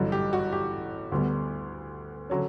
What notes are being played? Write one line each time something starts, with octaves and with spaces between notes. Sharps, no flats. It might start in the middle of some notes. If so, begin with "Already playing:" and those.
Already playing: A1 G2 D3 F#3
G4
F#4
G4
D2 D3 G3 B3
D3 F#3 C#4